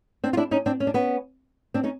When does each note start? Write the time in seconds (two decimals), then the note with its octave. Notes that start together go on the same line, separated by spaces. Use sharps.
0.24 C4 D4
0.33 F4
0.37 D4 E4
0.51 C#4 D#4
0.66 C4 D4
0.80 C#4
0.87 D4
0.94 B3 C#4
1.74 C4 D4
1.84 C#4 D#4